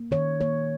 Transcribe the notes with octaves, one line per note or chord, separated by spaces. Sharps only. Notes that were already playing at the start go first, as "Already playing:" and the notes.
Already playing: A#3
D#3 C#5
A#3 C#5